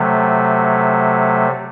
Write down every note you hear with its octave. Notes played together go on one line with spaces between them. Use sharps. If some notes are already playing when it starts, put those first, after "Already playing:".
Already playing: C3 F#3 A3